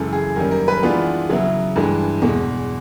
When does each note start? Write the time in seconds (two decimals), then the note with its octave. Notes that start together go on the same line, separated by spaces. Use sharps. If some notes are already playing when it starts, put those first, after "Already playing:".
Already playing: F#2 C#3 E3 G#3 A4
0.13 G#4
0.36 F#2 D#3 G3 A#3 C#4 A#4
0.51 A#4
0.68 B4
0.83 E3 G#3 B3 D4 F4
1.29 C#3 F#3 B3 E4
1.76 G2 E3 G#3
2.22 E2 B2 G#3